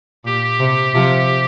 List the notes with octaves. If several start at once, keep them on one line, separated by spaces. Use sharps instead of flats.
A#2 G4
C3
C3 F3